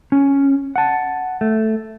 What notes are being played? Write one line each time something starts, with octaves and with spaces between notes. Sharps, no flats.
C#4
F#5 A5
A3